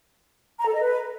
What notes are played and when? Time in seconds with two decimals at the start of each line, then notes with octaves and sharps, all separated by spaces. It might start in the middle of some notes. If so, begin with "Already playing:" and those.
0.59 A#5
0.66 A4
0.74 D#5
0.81 B4